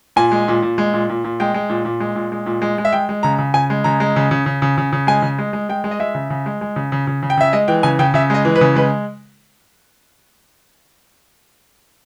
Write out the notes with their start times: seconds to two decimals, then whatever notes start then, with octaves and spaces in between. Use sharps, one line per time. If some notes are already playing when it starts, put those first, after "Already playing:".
0.16 A#2 G#5
0.32 G#3
0.48 A#2
0.62 A#2
0.78 G#3
0.93 A#2
1.09 A#2
1.24 A#2
1.40 G#3 G5
1.54 G#3
1.70 A#2
1.85 A#2
2.00 G#3
2.16 A#2
2.32 G#3
2.46 A#2
2.62 G#3
2.78 G#3
2.85 E5
2.93 G#3 G5
3.09 G#3
3.23 C#3 A#5
3.39 C#3
3.54 C#3 G#5
3.70 G#3
3.84 C#3 A#5
4.00 G#3
4.16 C#3
4.31 C#3
4.46 C#3
4.62 C#3
4.78 C#3
4.93 C#3
5.07 G#3 G#5
5.22 C#3
5.38 G#3
5.53 G#3
5.69 G#3 G5
5.84 G#3
5.91 D#5
6.00 G#3 E5
6.15 C#3
6.30 C#3
6.46 G#3
6.61 G#3
6.76 C#3
6.92 C#3
7.07 C#3
7.23 C#3
7.30 G5
7.37 C#3 E5
7.53 G#3 D#5
7.68 E3 G5
7.83 C#3 G#5
7.99 C#3 G5
8.14 C#3 E5
8.30 G#3 D#5
8.45 E3
8.56 B4
8.61 C#3
8.75 G#3 B4